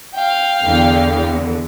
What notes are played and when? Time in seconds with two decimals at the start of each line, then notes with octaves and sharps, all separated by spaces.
0.15 F5 G5
0.64 E2 D3 B3